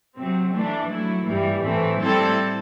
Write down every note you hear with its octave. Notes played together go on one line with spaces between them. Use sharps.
C3 F#3 C4
E3 A3 D4
F#3 A3 E4
G2 E3 G3
A2 E3 A3 C4
A2 G3 C4 E4 A4